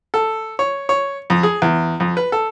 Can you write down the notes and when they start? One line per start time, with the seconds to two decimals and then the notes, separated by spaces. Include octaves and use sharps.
0.14 A4
0.59 C#5
0.89 C#5
1.30 F2
1.43 G#4
1.62 E2
2.00 F2
2.17 B4
2.32 A4